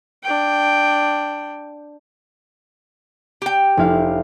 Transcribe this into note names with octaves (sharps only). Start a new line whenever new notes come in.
D4 G5
G4 G5
F1 E4 F5